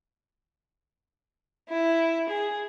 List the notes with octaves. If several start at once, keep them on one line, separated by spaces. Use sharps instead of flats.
E4
G#4